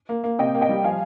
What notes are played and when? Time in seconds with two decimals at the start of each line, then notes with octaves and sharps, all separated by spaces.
0.09 A#3
0.24 A#3
0.39 C3 D#5 G5
0.54 A#3
0.61 D#5 G5
0.69 G3
0.83 F3 F5 G#5